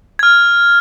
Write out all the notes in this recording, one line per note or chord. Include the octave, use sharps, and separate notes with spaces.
F6 G#6